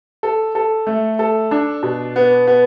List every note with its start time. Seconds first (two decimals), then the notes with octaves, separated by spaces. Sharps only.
0.23 A4
0.55 A4
0.87 A3
1.19 A4
1.51 D4
1.83 B2
2.16 B3
2.47 B3